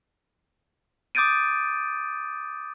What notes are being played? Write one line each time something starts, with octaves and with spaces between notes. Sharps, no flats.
D6 D#6 G6 A6 D7 D#7